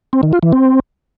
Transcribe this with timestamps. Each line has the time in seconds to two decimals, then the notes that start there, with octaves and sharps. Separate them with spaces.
0.13 C4
0.23 D#3
0.33 F4
0.43 E3
0.53 C4